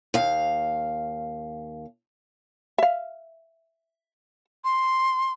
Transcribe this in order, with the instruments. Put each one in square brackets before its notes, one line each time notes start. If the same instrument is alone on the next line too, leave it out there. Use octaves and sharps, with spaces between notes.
[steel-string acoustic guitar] D#2 F5
[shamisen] E5 F5
[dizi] C6